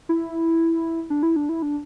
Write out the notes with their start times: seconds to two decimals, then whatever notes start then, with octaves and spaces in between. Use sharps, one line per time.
0.09 E4
1.10 D4
1.23 E4
1.36 D4
1.49 E4
1.62 D4